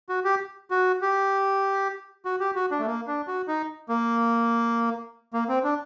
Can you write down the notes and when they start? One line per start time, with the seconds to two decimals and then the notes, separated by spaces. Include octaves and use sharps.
0.09 F#4
0.24 G4
0.71 F#4
1.02 G4
2.25 F#4
2.40 G4
2.55 F#4
2.71 D4
2.79 A3
2.86 A#3
3.07 D4
3.27 F#4
3.48 D#4
3.89 A#3
5.33 A#3
5.48 C4
5.64 D4